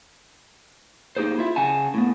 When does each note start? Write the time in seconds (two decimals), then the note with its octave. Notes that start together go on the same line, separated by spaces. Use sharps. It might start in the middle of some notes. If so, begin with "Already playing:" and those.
1.17 A#3 D#4 G4 G#4 C5
1.38 E4 F4 E5
1.56 C#3 G#4 F#5 G#5 A5
1.94 A2 B3